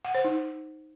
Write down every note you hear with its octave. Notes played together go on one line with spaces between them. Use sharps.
F#5
C5
D#4